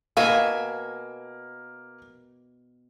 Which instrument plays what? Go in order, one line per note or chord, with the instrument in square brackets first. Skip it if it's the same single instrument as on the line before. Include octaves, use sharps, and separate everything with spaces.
[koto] B2 E5 G#5 [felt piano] A#3 [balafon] F5